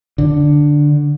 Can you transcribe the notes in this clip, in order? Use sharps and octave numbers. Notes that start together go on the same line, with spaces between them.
D3